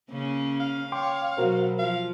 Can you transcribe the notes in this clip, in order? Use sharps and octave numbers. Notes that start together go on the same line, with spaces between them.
C#3 A#3 C#4
F5 F6
C#5 G5 C6 D6
B2 F#3 F#4 A#4 C5
F3 F5